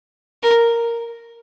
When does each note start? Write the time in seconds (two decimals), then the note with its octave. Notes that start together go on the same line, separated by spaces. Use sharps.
0.43 A#4